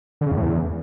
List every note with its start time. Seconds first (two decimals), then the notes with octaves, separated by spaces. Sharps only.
0.21 D3
0.26 C#3
0.32 E2
0.37 A2
0.42 E2